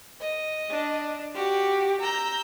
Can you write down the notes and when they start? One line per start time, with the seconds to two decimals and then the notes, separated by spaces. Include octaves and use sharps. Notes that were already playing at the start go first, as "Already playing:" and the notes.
0.20 D#5
0.70 D4
1.35 F#4 G4
2.01 A#5 E6 G6